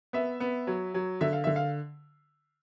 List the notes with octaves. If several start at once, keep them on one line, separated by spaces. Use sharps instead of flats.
B3 E5
B3
F#3
F#3
D3 E5
F5
D3 E5
F5